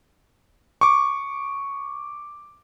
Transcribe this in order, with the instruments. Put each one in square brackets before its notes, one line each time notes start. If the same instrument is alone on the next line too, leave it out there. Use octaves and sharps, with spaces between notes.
[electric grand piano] C#6 D6